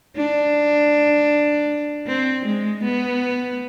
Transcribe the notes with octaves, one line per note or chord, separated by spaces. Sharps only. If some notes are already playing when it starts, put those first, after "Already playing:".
D4
C4
G#3
B3